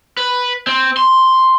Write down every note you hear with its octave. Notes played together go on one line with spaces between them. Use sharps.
B4
C4
C6